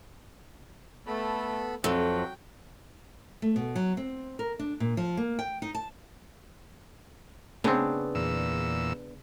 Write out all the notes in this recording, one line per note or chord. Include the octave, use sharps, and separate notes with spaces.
A3 B3 A4 B5
F2 F#3 A4 G5
A3
B2
F#3
C4
A#4
D4
A#2
F3
A#3
G5
D#4
A5
C#3 B3 C4 D4
E2 A#2 E6